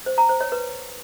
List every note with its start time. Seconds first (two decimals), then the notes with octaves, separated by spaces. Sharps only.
0.06 C5
0.18 A#5
0.29 C5
0.41 C#5
0.52 B4